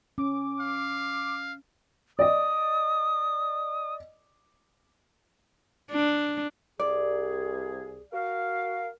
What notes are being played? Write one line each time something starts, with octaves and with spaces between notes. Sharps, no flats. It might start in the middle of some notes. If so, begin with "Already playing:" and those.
C#4 D6
F5
D5 D#5 D#6
D4
C2 G#4 D5
F#4 A#4 F5